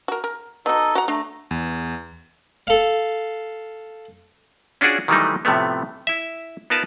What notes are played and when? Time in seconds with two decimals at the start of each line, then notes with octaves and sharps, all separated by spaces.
0.08 F#4 A#4
0.24 A#4
0.66 B3 D#4 F#4 A4 D#5
0.95 F#4 F#5 A#5
1.08 A3 D4 A#5
1.51 E2
2.67 A4 F5
4.81 C#4 D4 F4 F#4 G#4 D5
5.08 D#3 E3 F#3 G3 A3 D#4
5.45 A2 C3 F3 A3 B3
6.07 E4 E5
6.70 B3 D#4 F4 A#4 B4 A5